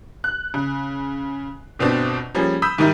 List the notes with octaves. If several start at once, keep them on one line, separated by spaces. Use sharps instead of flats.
F#6
C#3
G1 B2 C4 D4
F3 G3 A#3 C#4 G#4
B5 D#6 E6 G6 B6
G#2 D#3 G3 D#4 E4